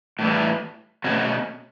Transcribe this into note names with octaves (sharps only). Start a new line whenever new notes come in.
A2 E3 G3
B2 A3 C#4 F#4